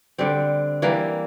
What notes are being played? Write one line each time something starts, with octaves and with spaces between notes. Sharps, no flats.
D3 G3 C4
E3 G3 A#3